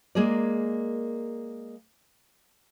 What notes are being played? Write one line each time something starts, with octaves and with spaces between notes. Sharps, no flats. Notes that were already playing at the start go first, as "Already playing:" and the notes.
G#3 A#3 G#4 A#4 D5